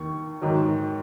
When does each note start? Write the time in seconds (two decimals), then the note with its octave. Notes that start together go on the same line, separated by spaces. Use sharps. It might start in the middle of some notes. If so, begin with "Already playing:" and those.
Already playing: D#2 D#3 C#6
0.42 G#2 D#3 F#3